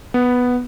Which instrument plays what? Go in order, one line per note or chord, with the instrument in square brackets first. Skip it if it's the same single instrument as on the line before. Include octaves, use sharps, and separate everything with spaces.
[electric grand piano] B3